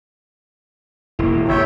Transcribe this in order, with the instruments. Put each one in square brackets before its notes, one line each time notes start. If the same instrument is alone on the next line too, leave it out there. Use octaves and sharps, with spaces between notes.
[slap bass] E1 A#3 [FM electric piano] E4
[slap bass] G1 [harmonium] C#5 E5 G5